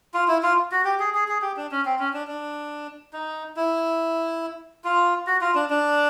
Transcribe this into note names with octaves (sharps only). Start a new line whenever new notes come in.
F4
E4
F4
F#4
G4
G#4
G#4
G#4
G4
D4
C#4
C4
C#4
D4
D4
D#4
E4
F4
F#4
F4
D4
D4